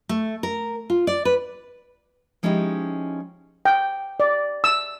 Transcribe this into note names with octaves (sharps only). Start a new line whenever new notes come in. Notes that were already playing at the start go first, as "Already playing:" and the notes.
A3
A#4
F4
D5
B4
F3 G#3 C#4 D#4 E4 G4
G5
D5
E6